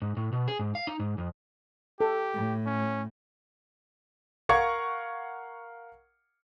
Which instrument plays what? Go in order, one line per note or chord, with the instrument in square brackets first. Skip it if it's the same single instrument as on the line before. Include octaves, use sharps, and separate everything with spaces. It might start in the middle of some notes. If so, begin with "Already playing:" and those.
[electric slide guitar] G#2
A2
B2
G#4
G#2
F5
D#4
G#2
F2
[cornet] G4 [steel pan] A4
[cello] A2
[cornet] C#4
[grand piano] A#4 F5 F#5 C#6 G#6 C#7